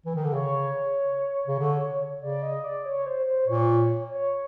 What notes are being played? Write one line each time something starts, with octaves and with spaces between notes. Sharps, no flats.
E3
D#3
D3
C#3 C#5
C#3
D3
C#3 D5
D#5
D5
C#5
C5
C5
A#2 C#5
C#5